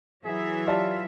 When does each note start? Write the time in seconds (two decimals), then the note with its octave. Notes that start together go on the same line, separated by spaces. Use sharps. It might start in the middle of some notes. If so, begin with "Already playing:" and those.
0.25 E3 F#3 G#4 E5
0.67 F4 G4 D5 A5